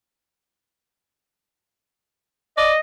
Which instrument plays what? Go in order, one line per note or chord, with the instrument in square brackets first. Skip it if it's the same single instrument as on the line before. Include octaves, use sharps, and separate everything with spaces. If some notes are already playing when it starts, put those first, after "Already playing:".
[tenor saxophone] D5 [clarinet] D#5